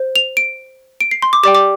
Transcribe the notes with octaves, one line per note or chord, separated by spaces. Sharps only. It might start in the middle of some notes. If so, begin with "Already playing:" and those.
Already playing: C5
F7
D7
D7
C7
C6
D6
G4 D5 G5 D6
D6